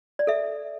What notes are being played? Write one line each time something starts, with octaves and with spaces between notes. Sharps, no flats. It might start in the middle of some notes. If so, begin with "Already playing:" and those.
D5
A4 E5